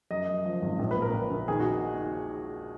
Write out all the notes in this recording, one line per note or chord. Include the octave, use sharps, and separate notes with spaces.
F#2 D#5
F#2
F3
G#1
A#1
B4
A#2
A#4
A#1
A#1
D#2 G#4
F#4
D#4